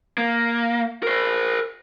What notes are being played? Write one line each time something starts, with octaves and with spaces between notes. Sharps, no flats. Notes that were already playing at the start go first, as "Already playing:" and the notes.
A#3
A#4 C5